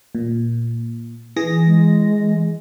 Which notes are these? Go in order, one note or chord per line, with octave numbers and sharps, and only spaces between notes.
A#2
E3 G#4 A#6
G#3